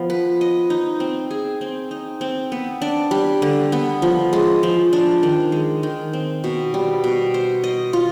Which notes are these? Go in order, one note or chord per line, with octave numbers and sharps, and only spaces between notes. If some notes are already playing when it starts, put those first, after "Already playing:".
Already playing: F3 B3
B4
D#5
D#4
C4
G#4
C4
D#4
C4
B3
D4
G3
D3
B3
F3
G#3
F3
D4
D#3
G#3
D#3
C4
B2
G3
B2
C5
D#5
F4